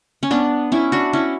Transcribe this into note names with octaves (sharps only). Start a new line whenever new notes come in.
C#4
B3 D4
C#4 E4
D4 F#4
C#4 E4